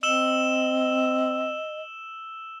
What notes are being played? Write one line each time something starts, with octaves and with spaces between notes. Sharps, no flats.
C4 D#5 E6 E7 G7